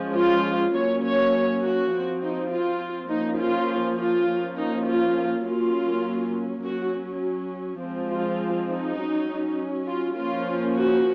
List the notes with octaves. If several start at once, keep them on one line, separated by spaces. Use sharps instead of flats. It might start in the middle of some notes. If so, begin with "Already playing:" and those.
Already playing: F3 G#3 C#4
F4
F#3 A#3 C#4 C#5
C#5
F#4
F3 C4
D#4
F4
F3 A#3 C#4 D#4
F4
F4
F3 A#3 C#4
D#4
F4
F#3 A#3 C#4 F4
F#3 C#4 F#4
F3 G#3 C4
F4
D#4
F#3 C#4
F4
F3 A#3 C#4 F4
F#4